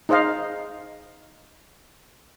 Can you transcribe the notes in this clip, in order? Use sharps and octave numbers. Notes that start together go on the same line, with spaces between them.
D#4 G#4 C5 D#5 F5